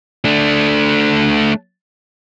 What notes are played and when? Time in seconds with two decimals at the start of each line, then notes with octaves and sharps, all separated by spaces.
0.25 A3 D4